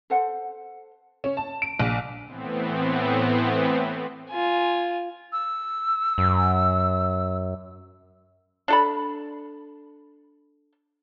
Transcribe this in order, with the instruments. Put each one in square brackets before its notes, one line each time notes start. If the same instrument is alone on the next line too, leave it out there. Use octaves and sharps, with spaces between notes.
[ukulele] A4 C5 F#5
[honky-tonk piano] C#4
A5
D7
A#1
[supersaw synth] A2 E3 B3 C4
[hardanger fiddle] F4 G#5
[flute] E6
[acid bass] F#2
[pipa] D4 A4 B5